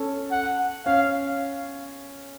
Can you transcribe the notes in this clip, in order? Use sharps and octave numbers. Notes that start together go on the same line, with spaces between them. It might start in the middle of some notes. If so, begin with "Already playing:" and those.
Already playing: C#4 A4
F#5
C#4 F5